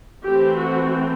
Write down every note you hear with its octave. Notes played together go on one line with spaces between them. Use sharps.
E3 A3 C4 G4
F#4